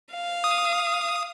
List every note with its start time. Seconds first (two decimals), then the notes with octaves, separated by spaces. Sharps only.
0.13 F5
0.44 D#6